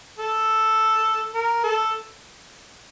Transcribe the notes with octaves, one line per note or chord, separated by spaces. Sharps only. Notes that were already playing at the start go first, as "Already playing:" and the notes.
A4
A#4
A4